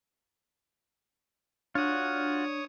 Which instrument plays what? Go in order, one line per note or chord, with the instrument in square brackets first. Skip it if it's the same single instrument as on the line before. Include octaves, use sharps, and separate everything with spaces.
[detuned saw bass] D4 [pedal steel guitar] F4 F#4 [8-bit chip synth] C#5 D#6